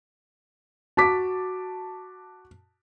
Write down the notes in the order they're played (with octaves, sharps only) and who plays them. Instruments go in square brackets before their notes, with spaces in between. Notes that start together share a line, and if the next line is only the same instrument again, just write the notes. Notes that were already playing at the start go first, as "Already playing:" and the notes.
[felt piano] F#4 D6 [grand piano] A5 B6